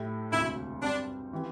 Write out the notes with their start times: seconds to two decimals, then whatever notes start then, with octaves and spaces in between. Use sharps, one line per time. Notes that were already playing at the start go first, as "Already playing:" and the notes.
Already playing: A2 A3 E4 G4
0.32 E1 D2 C3 E4
0.82 G2 G3 C4 D4
1.33 E3 C4 G4